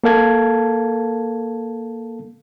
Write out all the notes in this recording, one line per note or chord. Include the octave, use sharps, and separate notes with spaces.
A#3 A4 A#4 F5 A5 G#6